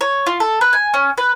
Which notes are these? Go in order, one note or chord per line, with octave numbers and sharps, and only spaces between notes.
C#5
F4
A4
B4
G#5
C#4
B4